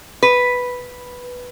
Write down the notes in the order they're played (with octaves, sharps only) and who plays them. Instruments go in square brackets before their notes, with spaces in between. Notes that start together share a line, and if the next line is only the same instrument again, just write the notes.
[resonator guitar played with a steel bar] B4